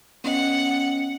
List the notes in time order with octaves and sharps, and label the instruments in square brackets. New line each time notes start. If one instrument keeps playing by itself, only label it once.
[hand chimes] B3 C#4 D#5 [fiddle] F#5